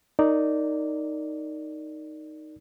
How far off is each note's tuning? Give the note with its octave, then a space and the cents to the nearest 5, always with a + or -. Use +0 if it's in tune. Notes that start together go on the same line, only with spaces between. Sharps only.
D#4 +0 A#4 -20 D5 -10